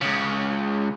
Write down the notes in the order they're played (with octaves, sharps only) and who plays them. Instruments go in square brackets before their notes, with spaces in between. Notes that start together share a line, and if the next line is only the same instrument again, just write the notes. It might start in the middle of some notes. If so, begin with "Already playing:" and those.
[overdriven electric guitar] C#2 C#3